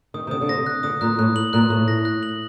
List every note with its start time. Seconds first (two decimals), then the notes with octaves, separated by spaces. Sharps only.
0.14 D#3 D#6
0.27 C3
0.31 D3 D#6
0.41 D3
0.48 C3 A#6
0.66 F#6
0.83 D3 D#6
1.01 A#2 F#6
1.19 A2 F#6
1.36 F#7
1.53 A#2 F#6
1.70 A2 F#6
1.88 A#6
2.05 F#6
2.23 F#7